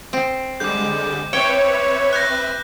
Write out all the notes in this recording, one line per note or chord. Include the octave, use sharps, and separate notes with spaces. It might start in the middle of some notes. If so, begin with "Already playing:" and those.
C4
D3 G3 G#3 D6 G6
C4 B4 C#5 E5 G5
F#6 G6 A#6